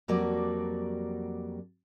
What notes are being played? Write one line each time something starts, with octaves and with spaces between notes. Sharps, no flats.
F2 F#3 G3 A#3 F#4 D5